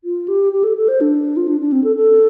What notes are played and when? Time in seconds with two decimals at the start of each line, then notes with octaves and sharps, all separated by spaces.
0.04 F4
0.28 G4
0.53 G4
0.64 A4
0.77 A4
0.88 C5
1.01 D4
1.37 F4
1.48 D4
1.61 D4
1.72 C4
1.84 A4
1.96 A4